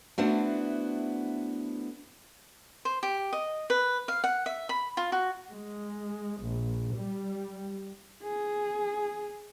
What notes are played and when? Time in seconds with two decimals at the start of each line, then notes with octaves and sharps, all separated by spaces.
0.18 A3 B3 D4 E4 F#4 C5
2.85 C5
3.03 G4
3.33 D#5
3.70 B4
4.08 F5
4.24 F#5
4.46 E5
4.69 B5
4.97 F4
5.12 F#4
5.49 G#3
6.41 A#1
6.95 G3
8.23 G#4